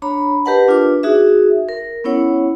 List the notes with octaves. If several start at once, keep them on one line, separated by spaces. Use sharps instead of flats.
D4 C#5 A#5 B5
G4 A#4 B4 D#5 F#5 A5
D4 F4 B4 D6
D#4 F#4 G#4 E5
A#4
B3 C#4 E4 C#5 F#5